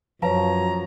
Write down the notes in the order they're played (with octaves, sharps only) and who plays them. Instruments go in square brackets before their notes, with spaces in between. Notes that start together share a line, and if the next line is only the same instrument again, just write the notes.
[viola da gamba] F#2 [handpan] F3 C#5 [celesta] B4 F5 A5 [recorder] A#5